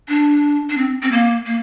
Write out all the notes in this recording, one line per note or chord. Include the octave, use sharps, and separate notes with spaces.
D4
D4
C4
C4
A#3
A#3